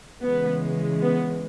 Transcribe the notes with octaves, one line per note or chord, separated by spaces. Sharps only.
C#3 E3 G#3 B3
B3